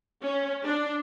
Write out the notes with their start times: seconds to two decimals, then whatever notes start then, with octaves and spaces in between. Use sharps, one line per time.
0.24 C#4
0.66 D4